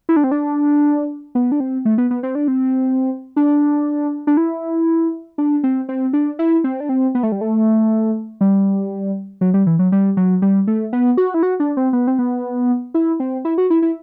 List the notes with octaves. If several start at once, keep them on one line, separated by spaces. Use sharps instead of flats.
E4
D4
C4
D4
B3
D4
C4
A3
B3
B3
C4
D4
C4
D4
D4
E4
D4
C4
C4
D4
E4
C4
D4
C4
B3
A3
G3
A3
G3
F#3
G3
E3
F#3
G3
F#3
G3
A3
B3
F#4
E4
F#4
D4
C4
B3
C4
B3
E4
C4
E4
F#4
E4
E4